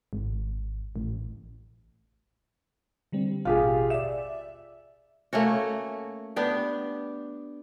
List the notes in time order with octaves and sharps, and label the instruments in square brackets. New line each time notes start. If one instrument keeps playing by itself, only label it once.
[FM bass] G#1
A1
[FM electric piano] D3 G3 C4
[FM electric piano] A1 B2 [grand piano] F4 G4 G#4
[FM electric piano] D5 E5 [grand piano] E7
[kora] A3 A#3 C#4 F#4
B3 D4 G4